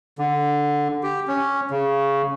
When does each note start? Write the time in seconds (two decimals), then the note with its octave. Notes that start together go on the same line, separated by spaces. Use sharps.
0.19 D3
1.03 G4
1.28 C#4
1.71 C#3